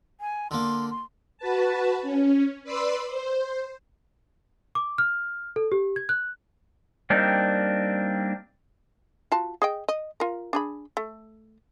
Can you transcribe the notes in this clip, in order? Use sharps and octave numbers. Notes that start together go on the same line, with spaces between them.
G#5
D3 A#3 C6
C6
F#4 B4 A5
C#4
B4 D5 B5 C6 E6 B6
C5
D6
F6
A4
G4
G#6
F#6
G3 A#3 C4 D4 D#4
F4 F#4 A5
G#4 D#5 G5
D#5
F4 A#4
D4 G#4 B5
A3